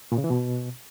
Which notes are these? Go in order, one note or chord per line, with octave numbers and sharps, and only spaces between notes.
A#2
C#3
E3
B2